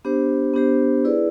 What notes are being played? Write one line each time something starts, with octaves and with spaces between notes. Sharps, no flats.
B3 D4 G4 C5
B3 D4 G4 C5
E4 G#4 B4 D5